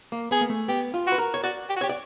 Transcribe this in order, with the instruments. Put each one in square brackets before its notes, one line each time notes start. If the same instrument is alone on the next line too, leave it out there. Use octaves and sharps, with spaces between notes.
[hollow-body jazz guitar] A#3
[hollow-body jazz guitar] B3 [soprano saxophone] G#4
[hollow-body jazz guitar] A#3
A3
[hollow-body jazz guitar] B3 [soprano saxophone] G4
[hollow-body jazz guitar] F4
[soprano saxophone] F#4
[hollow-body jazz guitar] B4
A#4
C#5
[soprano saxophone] F#4 [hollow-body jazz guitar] D5
[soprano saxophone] G4
F#4
[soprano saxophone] G4 [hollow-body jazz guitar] C#5
[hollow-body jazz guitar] D5